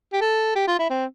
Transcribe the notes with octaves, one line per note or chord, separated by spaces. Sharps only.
G4
A4
G4
F4
E4
C4